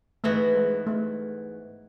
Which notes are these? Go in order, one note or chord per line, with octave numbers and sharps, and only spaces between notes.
G#2 E3 A3 B3 F#4
G#3
A3